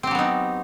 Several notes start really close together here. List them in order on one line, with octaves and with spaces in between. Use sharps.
C4 G4 F#3 B3 D#4